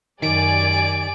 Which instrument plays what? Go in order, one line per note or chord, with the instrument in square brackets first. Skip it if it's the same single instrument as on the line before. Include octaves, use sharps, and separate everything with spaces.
[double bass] F#2 [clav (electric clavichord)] D#3 [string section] G4 D5 G#5 [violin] D7